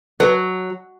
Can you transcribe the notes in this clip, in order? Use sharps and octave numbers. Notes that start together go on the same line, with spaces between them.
F#3 B4